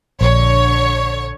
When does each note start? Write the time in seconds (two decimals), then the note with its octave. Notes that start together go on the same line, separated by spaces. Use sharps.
0.21 A#1 D3 C#5